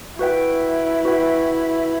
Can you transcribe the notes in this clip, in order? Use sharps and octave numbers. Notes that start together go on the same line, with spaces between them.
E4 F#4 B4 E5 G5
F#4 B4 E5 G5